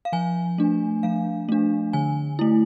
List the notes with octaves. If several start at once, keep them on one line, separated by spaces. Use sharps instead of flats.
F5
F3 G#5
A3 D4
F3 F5
A3 D4
D3 G#5
A3 E4